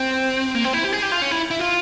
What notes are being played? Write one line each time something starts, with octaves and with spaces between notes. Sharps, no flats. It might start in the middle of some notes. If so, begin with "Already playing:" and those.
Already playing: C4
A#3
C4
E4
G4
G#4
G4
F4
C#4
E4
E4
F4